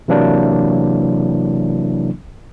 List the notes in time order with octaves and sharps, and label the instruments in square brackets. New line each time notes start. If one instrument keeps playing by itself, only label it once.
[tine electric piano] C3 E3 F#3 A#3 D4 E4